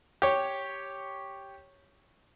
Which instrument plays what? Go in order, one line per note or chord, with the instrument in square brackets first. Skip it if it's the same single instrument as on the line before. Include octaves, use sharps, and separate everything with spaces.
[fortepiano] G4 C#5